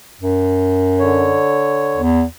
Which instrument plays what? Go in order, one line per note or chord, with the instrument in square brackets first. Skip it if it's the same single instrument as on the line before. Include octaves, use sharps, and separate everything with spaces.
[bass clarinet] F#2
[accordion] D3 C#5
[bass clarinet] E2